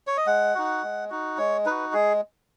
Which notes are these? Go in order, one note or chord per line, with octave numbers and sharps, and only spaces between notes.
C#5
D#5
G#3 F#5
D#4 F#4
G#3
D#4 F#4
G#3 C#5
D#4 F#4 B4
G#3 G#4